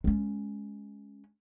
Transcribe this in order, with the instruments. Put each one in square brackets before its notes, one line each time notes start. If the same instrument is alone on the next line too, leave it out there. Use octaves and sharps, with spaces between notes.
[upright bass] G#3 C#4